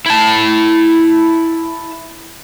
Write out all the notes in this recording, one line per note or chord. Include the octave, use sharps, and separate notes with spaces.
E4 A5